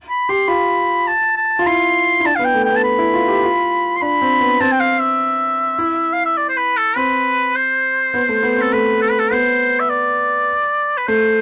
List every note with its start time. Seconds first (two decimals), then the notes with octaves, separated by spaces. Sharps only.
0.09 B5
0.29 G4 C6
0.48 F4 B5
1.08 A5
1.36 A5
1.59 F4
1.66 E4 C6
2.20 E4
2.25 D4 A5
2.36 B3 F5
2.45 G5
2.54 A3
2.65 B3 G5
2.76 A5
2.83 B5
2.99 E4
3.14 F4
3.28 G4
3.43 F4
3.96 C6
4.01 D4 B5
4.22 C4
4.41 B3
4.60 C4 A5
4.72 G5
4.80 F5
5.00 E5
5.79 E4
6.13 F5
6.25 E5
6.37 D5
6.49 C5
6.57 B4
6.77 A4
6.96 C4 B4
7.55 C5
8.14 B3
8.29 A3
8.43 B3
8.58 C4
8.61 A4
8.73 A3 B4
9.02 A4
9.10 B4
9.19 A4
9.31 B3 C5
9.80 E5
9.90 D5
10.97 B4
11.08 A3 C5